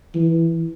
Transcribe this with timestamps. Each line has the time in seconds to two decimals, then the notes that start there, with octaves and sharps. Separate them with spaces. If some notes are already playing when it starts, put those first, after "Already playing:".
0.15 E3